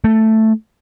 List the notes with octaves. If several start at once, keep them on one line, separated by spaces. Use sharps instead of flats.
A3